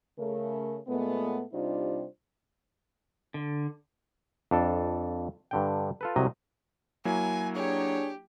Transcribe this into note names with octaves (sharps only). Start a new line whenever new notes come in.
C#3 A3 A#4
A#2 G#3 A3 B3
C3 G3 D4 D#4 F4 C5
D3
F2 D4 A4
G2 D3 G5
F4 A4 B4
C2 C3 F#3 D#5
F#3 A#3 E4 G#5
D4 G4 G#4 C#5